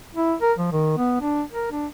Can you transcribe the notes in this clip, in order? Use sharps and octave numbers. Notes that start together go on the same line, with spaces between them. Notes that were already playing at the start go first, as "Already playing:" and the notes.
E4
A#4
F3
D#3
B3
D4
A#4
D4